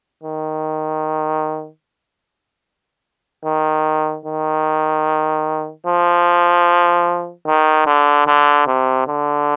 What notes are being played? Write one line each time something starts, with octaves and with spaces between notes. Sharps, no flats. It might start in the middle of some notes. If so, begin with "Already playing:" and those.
D#3
D#3
D#3
F3
D#3
D3
D3
C3
D3